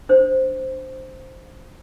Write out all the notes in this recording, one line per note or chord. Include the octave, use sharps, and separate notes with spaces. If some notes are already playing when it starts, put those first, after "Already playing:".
D4 C5